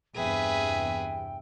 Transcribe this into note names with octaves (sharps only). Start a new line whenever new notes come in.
E2 G2 C3 G#4 B4 E5 G5